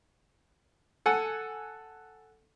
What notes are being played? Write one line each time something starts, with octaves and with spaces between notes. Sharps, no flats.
A4 F#5 G#5